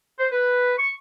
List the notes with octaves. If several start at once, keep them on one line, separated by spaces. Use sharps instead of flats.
C5
B4
C#6